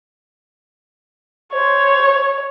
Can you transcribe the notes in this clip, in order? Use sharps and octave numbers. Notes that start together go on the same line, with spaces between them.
C5 C#5